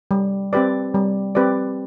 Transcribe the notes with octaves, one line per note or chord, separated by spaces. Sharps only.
G3
C4 G4 B4 D5
G3
C4 G4 B4 D5